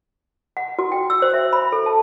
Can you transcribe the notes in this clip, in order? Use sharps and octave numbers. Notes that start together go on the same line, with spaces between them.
F#5
F#4
G5
E6
C5
E5
B5
A4
A5